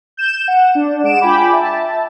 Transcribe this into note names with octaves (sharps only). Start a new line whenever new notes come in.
G6 E7
F#5
D4
G#3 F#5 D7 E7
F4 G5 G#5 B5 D6
E5 A5